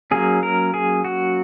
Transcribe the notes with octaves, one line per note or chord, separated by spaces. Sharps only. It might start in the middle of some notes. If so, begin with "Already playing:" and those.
F#3 A#3 C#4 G#4
A#4
G#4
F#4